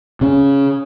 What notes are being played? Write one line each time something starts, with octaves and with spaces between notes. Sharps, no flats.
C#3 C#4